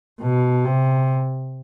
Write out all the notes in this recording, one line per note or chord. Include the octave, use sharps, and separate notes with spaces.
B2
C3